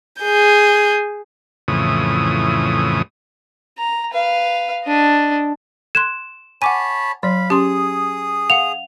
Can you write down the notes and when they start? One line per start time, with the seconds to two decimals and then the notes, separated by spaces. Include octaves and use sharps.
0.21 G#4 G6
1.68 F2 A2 C#3 E3 D#6
3.78 A#5
4.11 B4 F5
4.86 D4 D#5
5.95 C6 F#6 G#6 E7
6.62 C#5 F#5 G#5 A5 B5 D6 D#7
7.23 F#3 D5 F5 B5
7.50 C#4 G4 G#4 C6 D#6
8.50 F5 F#5 C#7 F7